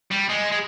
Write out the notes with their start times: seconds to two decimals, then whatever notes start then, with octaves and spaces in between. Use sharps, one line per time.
0.11 G3
0.29 G#3
0.51 G#3